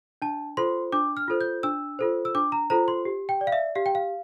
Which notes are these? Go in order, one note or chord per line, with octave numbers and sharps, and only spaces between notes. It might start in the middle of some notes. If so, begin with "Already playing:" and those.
D4 A5
F4 A4 C5 C6
D4 D6
F6
F4 A4 C5
G6
D4 E6
F4 A4 C5
E6
D4 D6
A#5
F4 A4 C5 A#5
C6
G4
G5
D5
F5
E5
G4 F5
G5
F5